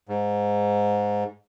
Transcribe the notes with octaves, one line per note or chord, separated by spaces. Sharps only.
G#2